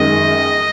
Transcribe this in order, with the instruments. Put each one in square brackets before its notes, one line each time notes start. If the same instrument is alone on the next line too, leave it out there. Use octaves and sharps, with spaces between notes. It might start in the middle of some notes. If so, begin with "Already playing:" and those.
Already playing: [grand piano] F#2 D#3 G#3 [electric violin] D#5